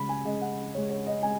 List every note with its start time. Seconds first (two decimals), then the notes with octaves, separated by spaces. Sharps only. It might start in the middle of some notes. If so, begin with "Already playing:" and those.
Already playing: C#3 G#3 B5
0.09 G#5
0.24 C#3 G#3 D#5
0.41 F#5
0.74 C#3 G#3 C#5
0.90 C#5
1.07 D#5
1.23 G#3 G#5